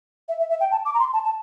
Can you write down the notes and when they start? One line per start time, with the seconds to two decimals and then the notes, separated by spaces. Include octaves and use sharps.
0.28 E5
0.39 E5
0.49 E5
0.60 G5
0.71 A5
0.85 D6
0.94 A#5
0.99 C6
1.13 A5
1.24 A5